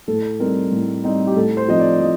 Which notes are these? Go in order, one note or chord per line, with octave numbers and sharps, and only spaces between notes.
A2 A4
G3 C4 D#4 A#4
A2
G3 C4 D#4
G4
A2 A4
C5
F3 C4 D#4 D#5
D5
A2 D#5